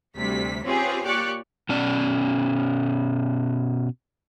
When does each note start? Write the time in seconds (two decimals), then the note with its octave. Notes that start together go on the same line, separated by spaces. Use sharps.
0.16 D2 C3 G3 B6
0.65 C4 C#4 F4 G4 G#4 B4
1.04 A#2 G4 C#5 D5 C#6 F#6
1.69 B2 C#4 D5